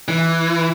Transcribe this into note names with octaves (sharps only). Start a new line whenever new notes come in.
E3